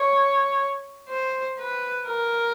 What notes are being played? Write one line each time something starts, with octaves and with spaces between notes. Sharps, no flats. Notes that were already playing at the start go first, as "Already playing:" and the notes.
Already playing: C#5
C5
B4
A#4